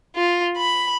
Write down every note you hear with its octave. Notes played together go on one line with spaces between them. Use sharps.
F4
B5